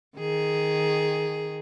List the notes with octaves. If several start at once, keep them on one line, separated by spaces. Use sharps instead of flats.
D#3 G#4